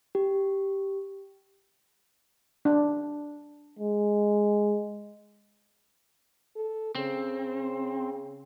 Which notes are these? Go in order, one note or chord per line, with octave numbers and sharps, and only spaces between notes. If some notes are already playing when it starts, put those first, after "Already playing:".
G4
D4
G#3
A4
C#3 C4